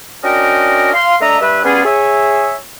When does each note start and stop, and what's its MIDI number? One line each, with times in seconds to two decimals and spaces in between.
0.24 0.90 61
0.24 0.90 62
0.24 0.90 66
0.24 0.90 70
0.24 0.90 75
0.24 0.90 79
0.94 1.16 77
0.94 1.16 84
1.21 1.40 57
1.21 1.40 62
1.21 1.40 75
1.21 1.40 76
1.21 1.40 82
1.41 1.61 43
1.41 1.61 71
1.41 1.61 76
1.64 1.84 55
1.64 1.84 59
1.64 1.84 61
1.64 1.84 65
1.64 1.84 68
1.85 2.56 68
1.85 2.56 73
1.85 2.56 76